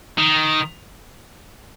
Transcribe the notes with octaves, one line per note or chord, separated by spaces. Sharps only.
D#3